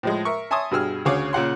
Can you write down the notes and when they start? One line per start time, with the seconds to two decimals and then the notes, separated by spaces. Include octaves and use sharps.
0.03 A2 F3 G#3
0.25 A#4 E5 C#6
0.51 E5 G#5 A5 C6 C#6 D#6
0.71 G2 B2 G#4 E6 F6
1.05 D2 C#3 G#4 C#5 F5 D6
1.33 A#2 C#3 F#5 C6